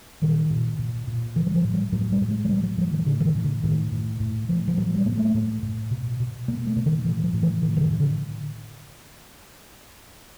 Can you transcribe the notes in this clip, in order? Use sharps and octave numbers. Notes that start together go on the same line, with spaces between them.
A#2 D#3
A#2
A#2
A#2
A2 E3
F#3
F3
A2
G3
A2 F#3
G3
A2
G#3
F#3
A2 G3
F#3
A2 F3
D#3
A2 D3
E3
D#3
A2
D3
A2 D#3
A2
A2
A2 F3
F3
A2 F#3
G3
A2 A#3
A3
A2
A2
B2
B2
B2 A#3
A3
B2
D#3
A2 E3
F3
A2
E3
A2 D#3
E3
D#3
A2
D3